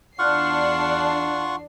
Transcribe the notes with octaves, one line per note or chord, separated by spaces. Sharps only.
E2 D4 F4 F#5 C#6 F6 F#6 C7